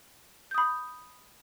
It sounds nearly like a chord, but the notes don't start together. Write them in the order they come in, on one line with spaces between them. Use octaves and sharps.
G6 D#6 B5